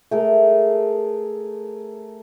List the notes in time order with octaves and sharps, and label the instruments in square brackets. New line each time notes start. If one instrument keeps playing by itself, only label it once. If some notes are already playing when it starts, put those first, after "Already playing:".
[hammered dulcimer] A3 G#4 A#4